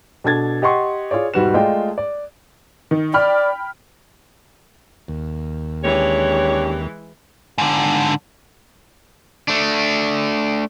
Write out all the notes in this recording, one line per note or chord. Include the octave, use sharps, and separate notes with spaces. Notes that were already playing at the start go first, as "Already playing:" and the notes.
B2 D4 A4 G#6 A6
G4 D#5 F#5 C6 C#6
F4 G#4 C#5 D5
E1 G#2 G3 F#4 B4 E7
G#3 A3 F4 D5 D#5 G5
D5
D#3
D5 G5 B5 F6
D#2
E3 G#3 C#4 D4 G4 C#5
G#2 D3
A3 D4